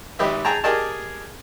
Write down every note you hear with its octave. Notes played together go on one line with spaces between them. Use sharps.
G#1 G4 B4 D#5 E5
G#4 G5 A5 A#5
G4 G#4 A#4 D5 D#5 A5